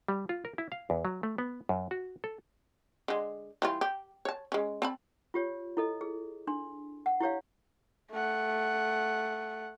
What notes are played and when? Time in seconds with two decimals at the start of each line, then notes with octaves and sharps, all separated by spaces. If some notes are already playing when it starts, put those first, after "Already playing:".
0.08 G3
0.29 F4
0.45 A#4
0.58 E4
0.72 F5
0.90 E2
1.05 F#3
1.23 A3
1.38 B3
1.69 F#2
1.91 F#4
2.24 A4
3.08 D3 G#3
3.62 E3 G3 F4
3.81 G4
4.25 C#5 A5
4.52 G#3 C#4
4.82 C4 A5 B5
5.34 F4 G4 C#5
5.77 E4 A4 D#5
6.01 G#4
6.47 D4 C6
7.06 F#5
7.20 E4 G4 C#5 F5
8.12 A3 F#5